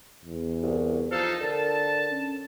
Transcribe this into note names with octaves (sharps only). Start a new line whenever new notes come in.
E2
C2
F3 D#4 A4 F5
D3 A#4 A5
C#4